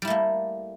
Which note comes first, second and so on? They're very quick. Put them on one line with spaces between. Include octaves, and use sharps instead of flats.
G3 E4 A3 A#3